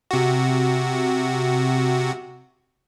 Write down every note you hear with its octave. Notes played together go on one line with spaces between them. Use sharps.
C3 F#4